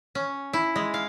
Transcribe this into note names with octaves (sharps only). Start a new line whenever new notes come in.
C#4
E4
G#3
F5